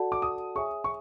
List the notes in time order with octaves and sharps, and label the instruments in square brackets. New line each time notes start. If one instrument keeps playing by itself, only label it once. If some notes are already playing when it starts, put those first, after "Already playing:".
Already playing: [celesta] F#4 A4 D5 F#5 A5
[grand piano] D6
D#6
[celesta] G#4 C#5 E5 G#5 [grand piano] C#6
[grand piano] C#6